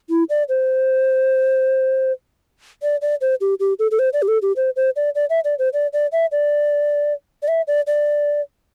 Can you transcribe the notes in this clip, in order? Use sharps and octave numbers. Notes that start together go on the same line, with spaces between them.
E4
D5
C5
D5
D5
C5
G4
G4
A4
A4
C5
D5
G4
A4
G4
C5
C5
D5
D5
E5
D5
C5
D5
D5
E5
D5
D5
E5
D5
D5